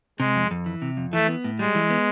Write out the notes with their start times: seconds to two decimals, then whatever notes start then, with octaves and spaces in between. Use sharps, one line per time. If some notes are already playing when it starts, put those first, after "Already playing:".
0.19 C3 G#3
0.35 F2
0.51 F2
0.66 E3
0.82 C3
0.97 F2
1.13 E3 A3
1.28 B3
1.44 A2
1.59 G3 G#3
1.75 E3
1.90 B3